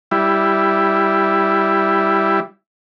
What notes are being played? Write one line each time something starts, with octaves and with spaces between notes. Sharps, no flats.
G3 E4